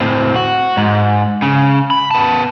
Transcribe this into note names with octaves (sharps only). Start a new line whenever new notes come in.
A2 C4
F#4
G#2
C#3
B5
B3 A5